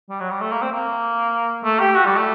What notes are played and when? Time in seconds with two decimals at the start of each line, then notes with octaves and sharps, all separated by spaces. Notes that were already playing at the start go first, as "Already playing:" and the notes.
0.10 G3
0.20 F#3
0.30 G3
0.41 A3
0.51 A#3
0.62 C4
0.72 A#3
1.64 A3
1.80 G4
1.95 F#4
2.06 G3
2.16 A3